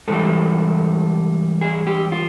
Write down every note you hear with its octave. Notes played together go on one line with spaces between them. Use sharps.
G#2 E3 G3 A4
G#4
G4
F4